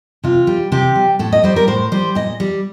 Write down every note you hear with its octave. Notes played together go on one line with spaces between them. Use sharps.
C3 F4
G3
C3 G4
G3
A2 A4
D#5
G3 C5
A#4
A2 C5
G3 C5
A#2 D#5
G3